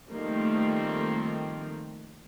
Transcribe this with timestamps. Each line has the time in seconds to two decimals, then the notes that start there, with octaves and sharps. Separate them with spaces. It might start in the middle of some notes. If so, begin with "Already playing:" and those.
0.11 D#3 F3 G3 A3 A#3 C4